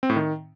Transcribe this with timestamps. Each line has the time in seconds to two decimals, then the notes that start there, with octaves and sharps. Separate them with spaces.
0.03 C4
0.10 A2
0.16 D#3